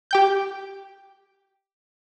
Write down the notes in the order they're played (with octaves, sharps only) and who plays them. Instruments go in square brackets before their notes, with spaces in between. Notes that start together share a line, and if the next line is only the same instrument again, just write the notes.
[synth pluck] G4 G5 G6